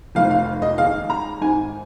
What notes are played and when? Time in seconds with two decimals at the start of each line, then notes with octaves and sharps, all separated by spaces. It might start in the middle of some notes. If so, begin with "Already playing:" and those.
0.15 F1 F2 D#3 F5
0.31 F5
0.62 D#5
0.78 D#2 D#3 G#3 F5
1.10 A#5
1.41 G#1 G#2 D#3 G#5